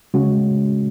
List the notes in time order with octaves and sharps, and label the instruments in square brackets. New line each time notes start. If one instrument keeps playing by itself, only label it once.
[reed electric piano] C#3 G#3 C#4 F#4